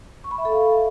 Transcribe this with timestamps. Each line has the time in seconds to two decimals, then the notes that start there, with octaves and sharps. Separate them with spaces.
0.24 C#6
0.31 B5
0.38 E5
0.45 A4
0.52 F5